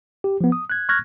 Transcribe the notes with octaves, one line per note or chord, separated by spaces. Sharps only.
G4
F3 B3
D#6
F#6 G#6
C#6 F6 F#6 G#6 A#6